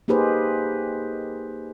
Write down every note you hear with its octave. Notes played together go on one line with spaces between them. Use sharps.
A#3 D#4 G4 G#4 B4 C5